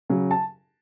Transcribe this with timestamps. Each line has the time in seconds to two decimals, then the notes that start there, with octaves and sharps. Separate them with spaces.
0.09 C#3 F#3
0.31 A5